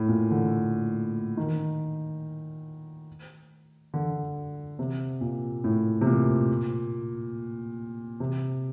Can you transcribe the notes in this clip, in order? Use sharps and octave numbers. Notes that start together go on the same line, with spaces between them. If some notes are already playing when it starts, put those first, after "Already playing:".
Already playing: A2
A#2
D3
D#3
D3
C3
A#2
A2
C3
A#2
C3